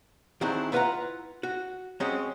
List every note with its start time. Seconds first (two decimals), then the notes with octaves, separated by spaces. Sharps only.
0.41 D#3 F#3 C4 D4 E4 G#4
0.72 E4 F4 B4 E5 F#5 A#5
1.43 F#4
2.00 F#3 G#3 C4 C#4 C#5 D#5